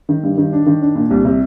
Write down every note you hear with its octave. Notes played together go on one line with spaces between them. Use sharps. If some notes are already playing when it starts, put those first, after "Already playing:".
D#3
G2
D#3
D4
D#3
D4
A#2
C2
C3